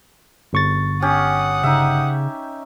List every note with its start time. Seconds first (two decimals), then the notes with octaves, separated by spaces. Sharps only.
0.53 G1 C#6 A6
1.02 C#4 G4 F#5 D#6
1.63 C#3 D#4 E5